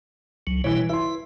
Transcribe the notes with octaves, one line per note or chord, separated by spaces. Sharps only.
C#2 F#3
B2 E3 G3 E4 C#5
E4 B4 C6